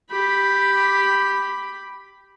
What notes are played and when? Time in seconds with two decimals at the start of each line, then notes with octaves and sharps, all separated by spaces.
0.11 G4 B5